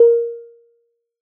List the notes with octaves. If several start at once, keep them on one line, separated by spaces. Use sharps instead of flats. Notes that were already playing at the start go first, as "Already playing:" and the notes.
Already playing: A#4